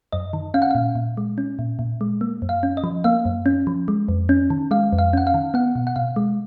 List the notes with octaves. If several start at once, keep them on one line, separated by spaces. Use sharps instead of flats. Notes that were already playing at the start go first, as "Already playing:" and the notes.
F#2 D#5
D#3
C#4 F5
F#5
A#2 F5
A#2
G#3
C#4
A#2
A#2
G#3
A#3
F#2
F5
C#4
D#5
F3
A#3 F5
F#2
C#4
F3
G#3
F2
C#4
D#3
G#3 F5
F2
F5
C#4 F#5
F5
D#3
B3 F#5
B2
F#5
B2 F5
G#3